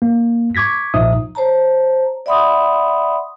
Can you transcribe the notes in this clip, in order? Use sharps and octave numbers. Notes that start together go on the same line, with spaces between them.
A#3
C#6 D6 G#6 A#6 B6
B1 A#2 F3 D#4 E5 D#6
C5 C#5 A5 A#5
D5 E5 F#5 B5 C6 D#6